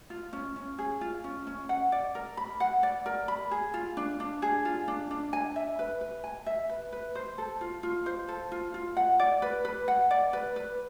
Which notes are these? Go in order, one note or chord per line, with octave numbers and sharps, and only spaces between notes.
F4
C#4
C#4
G#4
F4
C#4
C#4
F#5
D5
A#4
B5
F#5
D5
A#4
B5
G#4
F4
D4
D4
G#4
F4
D4
D4
G#5
E5
B4
B4
G#5
E5
B4
B4
C5
A4
F4
F4
C5
A4
F4
F4
F#5
D5
B4
B4
F#5
D5
B4
B4